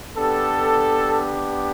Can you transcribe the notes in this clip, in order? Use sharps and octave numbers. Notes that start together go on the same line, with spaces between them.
B3 D4 G4 A4